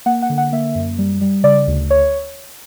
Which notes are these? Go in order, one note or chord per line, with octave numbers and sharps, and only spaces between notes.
A#3 F#5
F#5
D3
F#5
A#3 E5
F#2
G3
G3
C#3 D5
D2
C#5